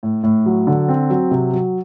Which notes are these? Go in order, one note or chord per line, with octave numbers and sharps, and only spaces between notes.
A2
A2
F#3
D3
C4
F#3
C3
F#3